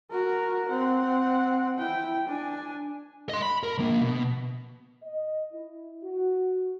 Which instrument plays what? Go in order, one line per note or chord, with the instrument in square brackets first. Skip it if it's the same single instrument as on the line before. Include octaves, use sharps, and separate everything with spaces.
[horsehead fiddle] F#4 A#4
C4 F#5
E4 G5
D4 G#5
[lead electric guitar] D#5 C6
B5
A#4
F3 A#3
B2
[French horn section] D#5
E4
F#4